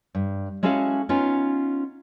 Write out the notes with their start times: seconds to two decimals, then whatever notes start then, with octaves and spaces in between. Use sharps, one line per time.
0.15 G2
0.63 G#3 C#4 E4 F#4 A4 F5
1.09 B3 C#4 D#4 F4